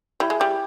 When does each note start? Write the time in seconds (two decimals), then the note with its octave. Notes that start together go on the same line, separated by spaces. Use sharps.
0.20 G3 E4
0.30 G#3
0.39 G3 G4